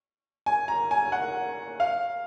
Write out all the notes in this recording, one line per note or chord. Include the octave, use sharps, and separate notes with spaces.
G#5
A#5
G#5
F#5
F5